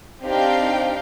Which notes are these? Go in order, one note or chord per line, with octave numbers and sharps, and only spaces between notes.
C4 D4 D#4 G4 F5 G5